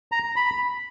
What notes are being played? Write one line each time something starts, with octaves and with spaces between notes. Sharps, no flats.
A#5
B5